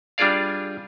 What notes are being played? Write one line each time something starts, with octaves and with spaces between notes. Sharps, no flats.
G3 D4 F4 G#4 D5 F5